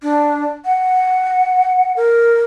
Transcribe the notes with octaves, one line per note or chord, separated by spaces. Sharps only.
D4
F#5
A#4